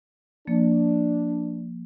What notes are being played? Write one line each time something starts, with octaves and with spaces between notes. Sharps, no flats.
F3 A#3 D4